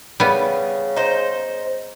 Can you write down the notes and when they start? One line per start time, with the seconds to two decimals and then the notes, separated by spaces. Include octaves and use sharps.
0.20 C#3 G3 B3
0.96 D#4 C5